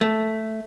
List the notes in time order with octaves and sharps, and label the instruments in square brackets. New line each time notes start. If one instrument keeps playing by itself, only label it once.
[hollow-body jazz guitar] A3